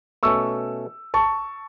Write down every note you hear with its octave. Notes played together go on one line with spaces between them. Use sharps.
B2 A3 C#4 C#6 E6
A5 C#6